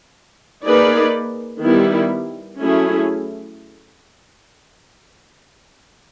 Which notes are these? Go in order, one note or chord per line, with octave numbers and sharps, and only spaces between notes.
A#3 D#4 G#4 B4 D5
D#3 G3 B3 E4
F#3 A3 C#4 E4 G#4